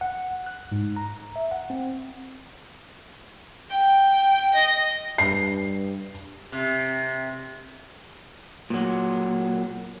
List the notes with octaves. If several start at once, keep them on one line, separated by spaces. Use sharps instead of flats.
F#5
F#6
G#2
A#5
E5
F#5
C4
G5
D#5
G2 C7
C3
A#2 F#3